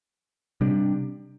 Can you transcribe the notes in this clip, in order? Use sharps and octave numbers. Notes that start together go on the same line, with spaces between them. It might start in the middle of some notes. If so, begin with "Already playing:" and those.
C3 G3 D4